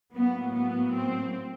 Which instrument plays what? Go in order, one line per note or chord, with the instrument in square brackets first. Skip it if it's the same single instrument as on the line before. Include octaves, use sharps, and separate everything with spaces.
[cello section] A2 F#3 A#3 B3
B3
C4